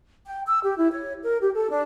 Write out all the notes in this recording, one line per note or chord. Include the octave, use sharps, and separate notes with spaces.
G5
E6
G4
E4
C#5
A#4
G4
A4
D4